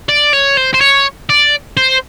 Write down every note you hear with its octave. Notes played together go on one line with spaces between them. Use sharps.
D5
C#5
C5
C5
C#5
D5
C5